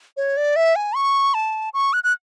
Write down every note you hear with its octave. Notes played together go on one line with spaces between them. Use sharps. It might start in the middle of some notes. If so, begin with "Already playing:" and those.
C#5
D5
E5
G#5
C#6
A5
C#6
F#6
F#6